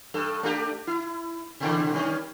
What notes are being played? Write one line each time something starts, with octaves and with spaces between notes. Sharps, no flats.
G2 A4
A3 D4 G4
E4
B2 D3 E3
G2 D#3 C#4